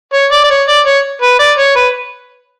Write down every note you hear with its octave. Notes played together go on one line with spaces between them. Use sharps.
C#5
D5
D5
C#5
D5
C#5
B4
D5
C#5
B4